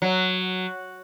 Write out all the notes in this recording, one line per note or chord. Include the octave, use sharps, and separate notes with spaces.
F#3